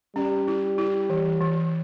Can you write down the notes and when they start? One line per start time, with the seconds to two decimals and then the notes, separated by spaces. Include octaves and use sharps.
0.16 G3 C#4
0.48 E4
0.78 E4
1.10 E3
1.41 E3